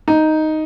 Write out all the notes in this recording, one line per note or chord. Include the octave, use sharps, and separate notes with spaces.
D#4